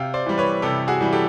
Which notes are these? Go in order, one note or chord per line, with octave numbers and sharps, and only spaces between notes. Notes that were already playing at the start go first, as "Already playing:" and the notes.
Already playing: C3 F5 G5
C5 D5
E3 G3
B4 C#5
C3 G4 A4
F#4 G#4
E3 G3
G4 A4